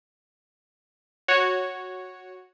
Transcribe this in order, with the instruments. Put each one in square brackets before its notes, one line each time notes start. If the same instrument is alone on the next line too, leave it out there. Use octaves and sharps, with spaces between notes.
[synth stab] F#4 C#5